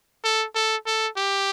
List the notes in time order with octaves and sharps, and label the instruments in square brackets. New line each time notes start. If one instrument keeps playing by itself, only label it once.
[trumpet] A4
A4
A4
G4